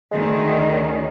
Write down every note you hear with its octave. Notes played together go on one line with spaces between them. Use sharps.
D2 D#3 G#3
C#4